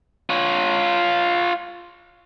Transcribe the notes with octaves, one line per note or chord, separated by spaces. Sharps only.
F4 C#5